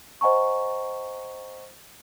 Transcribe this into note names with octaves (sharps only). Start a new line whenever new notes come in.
C5 D#5 F#5 G#5 A#5 C#6